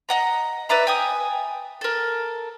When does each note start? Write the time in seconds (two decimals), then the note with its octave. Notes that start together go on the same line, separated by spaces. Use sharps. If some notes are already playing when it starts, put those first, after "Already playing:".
0.09 D#5 F#5 A#5
0.69 B4 D5 E5 A#5
0.87 G5 G#5 D#6
1.81 A4 A#4